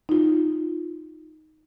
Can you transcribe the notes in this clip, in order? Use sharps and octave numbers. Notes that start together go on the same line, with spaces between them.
D#4 F4